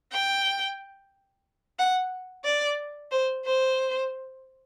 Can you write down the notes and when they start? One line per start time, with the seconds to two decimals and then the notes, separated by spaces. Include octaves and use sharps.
0.12 G5
1.79 F#5
2.44 D5
3.11 C5
3.45 C5